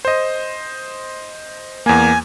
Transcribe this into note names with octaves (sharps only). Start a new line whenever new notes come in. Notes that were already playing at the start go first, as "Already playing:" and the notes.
C5 D#5
E2 A#3 G#5